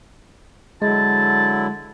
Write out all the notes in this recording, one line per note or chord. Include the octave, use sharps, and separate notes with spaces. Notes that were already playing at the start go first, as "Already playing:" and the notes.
D3 F#3 G#3 E4 A5